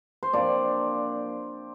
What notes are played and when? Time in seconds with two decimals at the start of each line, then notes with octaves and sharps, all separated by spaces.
0.23 C5
0.33 A#2 F3 C4 D4 D5